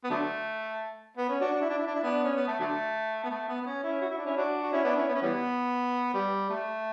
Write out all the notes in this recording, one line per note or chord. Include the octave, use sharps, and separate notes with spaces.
B3
D3 F#3 A3
B3
C#4
D4 F#4
D4
E4
D4
E4
D4
E4
B3 D4
C#4
B3
A3
D3 F#3 A3
B3
A3
B3
B3
C#4
C#4 E4
F#4
E4
D4
C#4 E4
D4 F#4
F#4
C#4 E4
B3 D4
C#4 E4
B3
C#4
E3 G3 B3
G3
A3